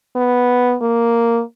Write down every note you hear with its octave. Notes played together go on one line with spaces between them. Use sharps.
B3
A#3